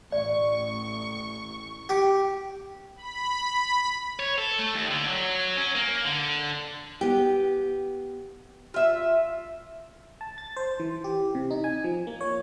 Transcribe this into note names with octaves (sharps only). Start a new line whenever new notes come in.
A1 D5 C#6
G4 D6
B5
C#5
A4
A3
D#2
D3
F#3
C#4
A#3
D3
B3 G4
F4 E5
A5
A6
C5
E3
G4
C3
D#4
G#5
F3
A#3
C#5